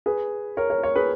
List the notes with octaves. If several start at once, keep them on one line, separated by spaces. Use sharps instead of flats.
G#4 B4
A#4 C#5
A#4 C#5
A#4 C#5
G#4 B4